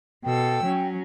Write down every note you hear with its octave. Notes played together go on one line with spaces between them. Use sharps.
B2 A4 G5 E6
F#3 C#4